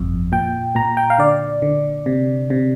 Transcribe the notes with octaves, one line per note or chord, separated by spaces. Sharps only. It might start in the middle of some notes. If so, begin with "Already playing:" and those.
Already playing: G1 F2
A#2 G5
A#2 A#5
G5
F5
D3 D5
D3
C3
C3